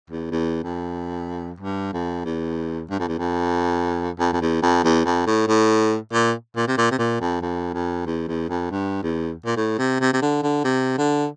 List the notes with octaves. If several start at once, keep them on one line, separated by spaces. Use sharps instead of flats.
E2
E2
F2
G2
F2
E2
G2
F2
E2
F2
F2
F2
E2
F2
E2
F2
A2
A2
A#2
A#2
C3
A#2
C3
A#2
F2
F2
F2
E2
E2
F2
G2
E2
A#2
A2
C3
C3
C3
D3
D3
C3
D3